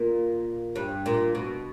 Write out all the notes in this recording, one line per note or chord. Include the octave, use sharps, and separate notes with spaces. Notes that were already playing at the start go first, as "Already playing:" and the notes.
Already playing: A#2
G2
A#2
B2